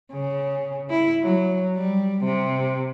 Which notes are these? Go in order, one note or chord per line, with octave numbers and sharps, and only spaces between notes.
C#3
E4
F#3
G3
C3